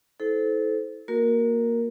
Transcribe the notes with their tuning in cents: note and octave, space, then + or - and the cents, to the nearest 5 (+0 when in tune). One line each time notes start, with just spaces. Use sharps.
E4 -35 A4 -20 C5 -20
A#3 +0 F#4 -30 A#4 +0